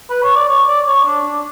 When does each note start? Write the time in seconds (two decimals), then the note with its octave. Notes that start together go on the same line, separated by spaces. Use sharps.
0.10 B4
0.23 C#5
0.36 D5
0.49 C#5
0.67 D5
0.87 C#5
1.06 D4
1.25 D4